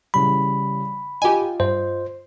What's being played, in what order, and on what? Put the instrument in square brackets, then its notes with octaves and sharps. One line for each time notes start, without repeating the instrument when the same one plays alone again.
[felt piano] C#3 E3 G3 [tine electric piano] B5
[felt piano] F4 D#5 [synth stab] G4 G#5
[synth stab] G2 [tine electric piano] C5